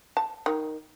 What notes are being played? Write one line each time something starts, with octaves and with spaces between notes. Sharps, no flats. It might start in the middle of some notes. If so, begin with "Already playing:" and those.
A5
D#3